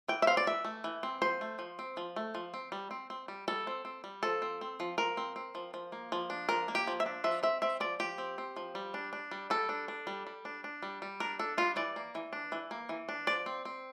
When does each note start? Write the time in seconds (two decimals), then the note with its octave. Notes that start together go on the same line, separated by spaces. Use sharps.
0.08 E3 G5
0.22 E5
0.27 C4 F5
0.37 D5
0.47 E3 E5
0.65 A3
0.84 E3
1.03 C4
1.22 F3 C5
1.41 A3
1.59 F3
1.79 C4
1.97 F3
2.16 A3
2.35 F3
2.54 C4
2.72 G3
2.91 C4
3.10 C4
3.28 G3
3.48 G3 A4
3.67 C4
3.85 C4
4.04 G3
4.23 F3 A4
4.42 C4
4.61 C4
4.80 F3
4.98 F3 A#4
5.17 C4
5.36 C4
5.55 F3
5.74 F3
5.92 A#3
6.12 F3
6.30 D4
6.49 F3 A#4
6.68 A#3
6.75 G4
6.87 F3
7.00 E5
7.06 D4
7.24 F3 E5
7.43 C4 E5
7.62 C4 E5
7.80 F3 D5
8.00 F3 G4
8.18 C4
8.38 C4
8.57 F3
8.75 G3
8.94 D4
9.13 D4
9.31 G3
9.50 G3 A4
9.69 D4
9.88 D4
10.07 G3
10.27 G3
10.45 D4
10.64 D4
10.82 G3
11.02 G3
11.20 D4 A#4
11.39 D4 A4
11.58 G3 F4
11.76 E3 D5
11.96 A#3
12.15 E3
12.33 D4
12.52 E3
12.71 A#3
12.89 E3
13.09 D4
13.27 F3 D5
13.46 C4
13.65 C4